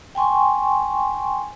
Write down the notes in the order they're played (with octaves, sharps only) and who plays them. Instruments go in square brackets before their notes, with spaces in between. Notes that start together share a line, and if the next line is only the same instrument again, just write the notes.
[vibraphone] G5 G#5 C6 C#6